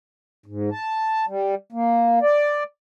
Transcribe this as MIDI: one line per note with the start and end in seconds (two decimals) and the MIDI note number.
0.46 0.70 44
0.72 1.25 81
1.27 1.55 55
1.72 2.19 58
2.22 2.63 74